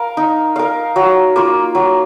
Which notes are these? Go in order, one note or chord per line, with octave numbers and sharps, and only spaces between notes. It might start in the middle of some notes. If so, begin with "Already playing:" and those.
Already playing: A#4 F5
D#4
A#4 F5
F#3
A#3 F4
F#3